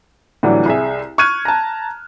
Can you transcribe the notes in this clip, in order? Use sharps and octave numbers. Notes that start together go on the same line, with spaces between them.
A2 D3 E3 F#3 G3
C2 G#4 E5
C#6 F6 F#6 G#6 D#7
A5 A#5